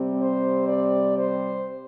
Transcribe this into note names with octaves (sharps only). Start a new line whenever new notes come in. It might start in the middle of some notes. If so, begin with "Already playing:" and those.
Already playing: C3 G3 C4
C5
D5
C5